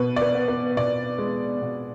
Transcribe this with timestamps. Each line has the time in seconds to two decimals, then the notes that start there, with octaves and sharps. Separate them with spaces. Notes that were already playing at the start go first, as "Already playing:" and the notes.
Already playing: B2 B4
0.16 D5
0.22 B4
0.34 B3
0.48 B4
0.77 B2 D5
1.18 G#3
1.61 B2